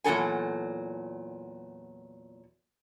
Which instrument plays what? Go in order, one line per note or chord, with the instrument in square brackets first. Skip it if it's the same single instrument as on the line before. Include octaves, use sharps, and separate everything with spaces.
[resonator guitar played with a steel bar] E2 A#2 F#3 A4 G#5